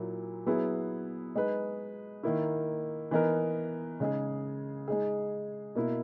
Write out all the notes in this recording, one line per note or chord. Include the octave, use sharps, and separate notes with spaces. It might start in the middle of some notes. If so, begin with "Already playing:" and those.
Already playing: A#2 F#3 A#3 E4
F#3 B3 E4 G#4 B4
G#3 D#4 G#4 B4
D#3 A#3 E4
E3 B3 D#4 A#4
C#3 G#3 D#4 G#4
G#3 D#4 G#4
B2 A#3 E4